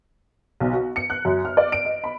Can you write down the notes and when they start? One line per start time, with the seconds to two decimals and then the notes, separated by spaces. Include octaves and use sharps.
0.60 B1
0.73 F#4
0.96 C#7
1.10 F#6
1.25 F#2
1.45 F6
1.57 D5
1.72 D7
1.85 D#5
2.04 B5